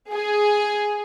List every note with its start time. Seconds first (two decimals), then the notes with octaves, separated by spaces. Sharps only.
0.12 G#4